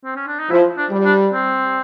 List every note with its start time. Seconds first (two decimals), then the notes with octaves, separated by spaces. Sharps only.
0.04 C4
0.16 C#4
0.27 D4
0.39 D#4
0.50 F3 E4
0.77 D4
0.91 G3
1.05 D4
1.33 C4